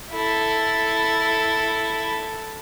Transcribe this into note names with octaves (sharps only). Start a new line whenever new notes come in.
E4 A4